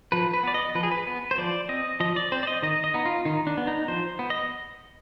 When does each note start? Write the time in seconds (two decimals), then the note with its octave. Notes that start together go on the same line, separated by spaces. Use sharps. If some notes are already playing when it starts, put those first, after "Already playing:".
0.12 F3 B4
0.34 B4
0.43 B3 D5
0.54 D#5
0.75 F3 B4
0.83 G#4
0.92 B4
1.07 B3
1.31 C5
1.38 F3 D5
1.69 C4 D#5
2.00 F3 D#5
2.16 D5
2.32 C4 C5
2.43 D5
2.47 D#5
2.62 D#3 D#5
2.84 D#5
2.94 B3 D#4
3.05 F4
3.25 D#3 D#4
3.47 D4
3.58 B3
3.67 D#4
3.88 F3 C5
4.19 B3
4.30 D#5